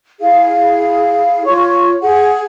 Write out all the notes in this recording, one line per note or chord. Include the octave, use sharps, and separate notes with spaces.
E4 G#4 F5
F4 C#5 C#6
G#4 F#5